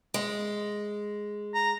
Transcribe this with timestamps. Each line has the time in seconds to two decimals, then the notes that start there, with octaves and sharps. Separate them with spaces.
0.14 G#3
1.54 A#5